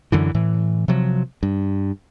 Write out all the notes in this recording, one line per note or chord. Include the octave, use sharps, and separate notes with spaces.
F#2 D3 E3
A2 E3
C3 F3 F#3
G2